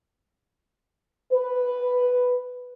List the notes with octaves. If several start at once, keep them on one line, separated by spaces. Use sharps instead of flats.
B4